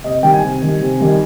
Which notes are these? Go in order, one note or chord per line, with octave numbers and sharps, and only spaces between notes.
C3 D#5
D#3 G3 G5
G#5
C3
D#3 G3
C3
D#3 G3